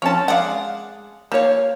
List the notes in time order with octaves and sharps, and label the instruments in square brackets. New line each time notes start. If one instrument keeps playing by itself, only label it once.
[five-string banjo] F3 C4 C#4 [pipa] C#5 A5
[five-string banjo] G#3 F5 [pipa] D5 F#5
[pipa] F3 F5 [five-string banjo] A#3 C#5